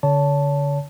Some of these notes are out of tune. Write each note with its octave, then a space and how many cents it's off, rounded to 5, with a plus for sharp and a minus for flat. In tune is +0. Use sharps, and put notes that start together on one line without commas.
D3 -35 C#5 +35 A5 +0